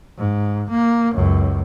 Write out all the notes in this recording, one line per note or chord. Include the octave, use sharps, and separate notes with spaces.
G#2
A#3
C#2 F#2